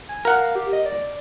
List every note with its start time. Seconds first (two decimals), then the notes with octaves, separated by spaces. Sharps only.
0.09 G#5
0.25 A#4 F5 F#5
0.55 G4
0.73 D#5
0.86 D5